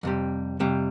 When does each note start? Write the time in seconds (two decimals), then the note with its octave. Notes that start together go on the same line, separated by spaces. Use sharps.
0.03 F2 C3 G3
0.60 F2 C3 G3